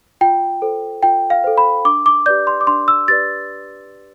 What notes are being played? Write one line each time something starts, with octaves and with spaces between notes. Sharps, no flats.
F4 G5
A4 C5
F4 G5
F5
A4 C5
B5
D4 D6
D6
G4 B4 D5 G6
C6
D6
D4 C6
E6
G4 B4 D5 A6